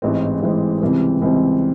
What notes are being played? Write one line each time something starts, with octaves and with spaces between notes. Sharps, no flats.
A1 G#2 E3 G#3 C4
A1 G#2 E3 G#3 C4
C#2 C3 E3 G3 C4
C#2 C3 E3 G3 C4